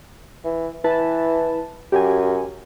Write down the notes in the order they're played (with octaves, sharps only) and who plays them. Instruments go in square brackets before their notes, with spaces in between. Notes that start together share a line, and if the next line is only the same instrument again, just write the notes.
[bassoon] E3
[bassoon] E3 [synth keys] E4 B4 A5
[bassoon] F#2 [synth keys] G4 G#5